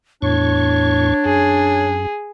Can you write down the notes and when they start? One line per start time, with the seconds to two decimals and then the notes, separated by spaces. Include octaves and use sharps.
0.22 E2 A2 D4 C#5 C#6
1.25 F#2 G#4